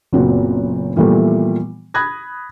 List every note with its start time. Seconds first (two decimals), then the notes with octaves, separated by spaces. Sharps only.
0.13 F#1 A#2 B3 C4 F#4
0.96 A#2 E3 F3 G3 A3 B3
1.94 B5 D#6 F#6 G#6 A#6